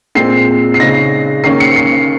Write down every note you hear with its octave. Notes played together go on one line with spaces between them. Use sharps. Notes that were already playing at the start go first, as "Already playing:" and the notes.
A#2 G#3 C4 C7
C7
C#3 G#3 D#4 A#6
D#3 A#3 C#4 C7
C#7
C7